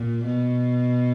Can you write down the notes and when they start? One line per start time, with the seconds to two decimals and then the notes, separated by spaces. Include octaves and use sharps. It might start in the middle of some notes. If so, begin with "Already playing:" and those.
Already playing: A#2
0.25 B2